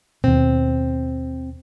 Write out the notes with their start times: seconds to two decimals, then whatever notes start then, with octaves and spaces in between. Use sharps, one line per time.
0.24 D#2 B2 C4